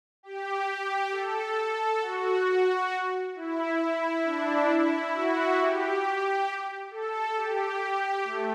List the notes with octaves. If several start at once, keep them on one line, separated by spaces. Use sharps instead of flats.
G4
A4
F#4
E4
D4
E4
F#4
G4
A4
G4
A3